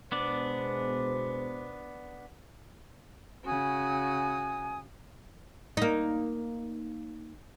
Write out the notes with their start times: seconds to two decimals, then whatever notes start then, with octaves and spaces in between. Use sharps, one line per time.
0.12 B2 G#3 B3 D4 C5 D5
3.45 C#3 F#4 G#5 D#6
5.77 A#3 D#4